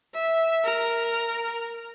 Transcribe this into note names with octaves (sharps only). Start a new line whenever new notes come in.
E5
A#4